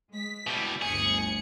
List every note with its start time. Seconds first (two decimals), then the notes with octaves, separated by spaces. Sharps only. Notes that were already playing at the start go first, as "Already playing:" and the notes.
0.12 G#3 B6
0.47 B2 G3 E4
0.82 G1 D2 G#4 C#7